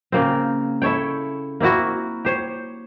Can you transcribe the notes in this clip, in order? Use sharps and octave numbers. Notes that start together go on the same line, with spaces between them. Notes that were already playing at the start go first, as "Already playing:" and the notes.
C#3 A#3 C4
E4 A4 C#5 G5
A#3 C4 E4 F#4
G4 C5 C#5